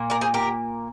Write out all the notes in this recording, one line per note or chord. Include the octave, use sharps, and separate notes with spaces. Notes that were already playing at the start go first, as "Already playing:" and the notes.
Already playing: A#2 A#3
A#4 D5
G#4 C5
G4 A#4